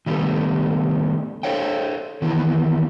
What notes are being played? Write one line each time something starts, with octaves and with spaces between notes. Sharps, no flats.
D#3 F#3 G3 A3 B3
A4 A#4 C5 C#5 F5 G5
D#3 E3 B3 E4